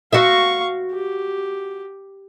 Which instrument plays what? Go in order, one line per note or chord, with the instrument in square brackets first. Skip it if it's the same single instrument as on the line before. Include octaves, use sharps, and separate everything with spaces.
[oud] F#4 C5 E5 [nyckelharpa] F5 C#6
[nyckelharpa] G4